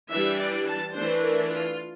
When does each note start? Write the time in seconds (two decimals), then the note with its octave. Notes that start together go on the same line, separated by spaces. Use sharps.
0.11 E3 G3 D4 E5
0.40 D5
0.67 A5
0.95 E3 A3 D4 C5
1.23 A#4
1.52 F4